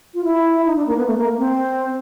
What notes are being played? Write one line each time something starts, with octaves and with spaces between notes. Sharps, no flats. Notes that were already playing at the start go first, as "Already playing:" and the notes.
F4
E4
D#4
D4
A#3
B3
A3
A#3
C4